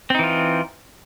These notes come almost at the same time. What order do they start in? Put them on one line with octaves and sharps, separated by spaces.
C4 D#4 E3 F4